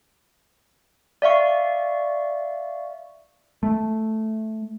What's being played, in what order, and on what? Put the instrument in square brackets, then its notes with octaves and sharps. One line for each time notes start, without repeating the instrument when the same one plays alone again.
[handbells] D5 E5 F5 C#6
[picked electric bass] A3